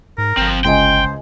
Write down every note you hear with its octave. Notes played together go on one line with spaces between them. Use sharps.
G#2 A#4
G1 F3 C4
C#2 C5 D#5 G5 G#5